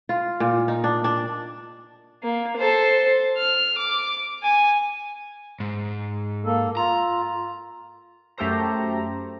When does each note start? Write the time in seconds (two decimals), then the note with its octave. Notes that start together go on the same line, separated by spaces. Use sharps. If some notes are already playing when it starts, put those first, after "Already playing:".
0.09 F4
0.40 A#2
0.68 D#4
0.84 D4
1.04 D4
2.23 A#3
2.57 A4 C5
3.37 F6
3.78 D6
4.43 G#5
5.60 G#2
6.45 A#3 A4
6.77 F4 A#5
8.38 F#2 A3 G4 A4 C5 A#5